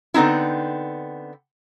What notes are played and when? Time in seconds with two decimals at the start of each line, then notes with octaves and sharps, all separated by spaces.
0.14 D3 B3 C4 D#4 E4